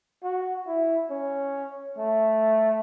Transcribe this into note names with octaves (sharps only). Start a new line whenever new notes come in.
F#4
E4
C#4
A3